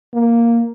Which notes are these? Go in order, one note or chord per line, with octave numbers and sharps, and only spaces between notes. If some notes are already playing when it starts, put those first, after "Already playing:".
A#3